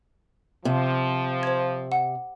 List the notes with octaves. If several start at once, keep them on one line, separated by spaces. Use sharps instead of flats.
C3 F3
C5 G#6
F#5